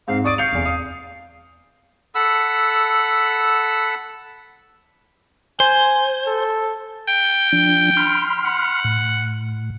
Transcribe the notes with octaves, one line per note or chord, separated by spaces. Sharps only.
G#2 C4 F5
D5 C#6 D#6 D7
F5 G6 C#7 F7
F1 E2
D#6
A4 F#5 B5 E6
C5 G#5
A4
G5
F3 D4
B5 C6 F6
F#5
A2